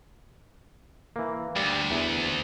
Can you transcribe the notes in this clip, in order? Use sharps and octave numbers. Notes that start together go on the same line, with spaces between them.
E3 A#3
D2 G3
E2